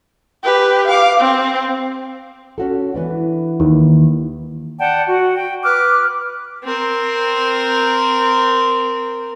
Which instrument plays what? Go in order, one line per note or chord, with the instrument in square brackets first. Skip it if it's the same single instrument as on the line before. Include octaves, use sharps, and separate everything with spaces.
[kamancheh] G4 B4
F5 D6
C4
[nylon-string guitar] C#4 F#4 A4
E3 B3 D4
[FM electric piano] D#2
[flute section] D5 F#5 G5 A5
F#4
G5
B4 D6 F6 F#6
[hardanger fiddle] C4 A#4